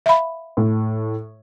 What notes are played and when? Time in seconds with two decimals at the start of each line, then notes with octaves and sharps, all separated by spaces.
0.06 E5 F5 B5
0.57 A2